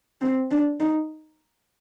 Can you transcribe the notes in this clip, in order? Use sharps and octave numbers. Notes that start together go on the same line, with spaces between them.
C4
D4
D#4